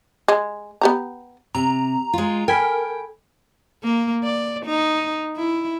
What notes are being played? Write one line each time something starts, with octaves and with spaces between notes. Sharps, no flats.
G#3
B3 G4 A#5
C3 A#5
G#3 F4
A4 A#4 G5 G#5 B5
A#3
D5
D#4
E4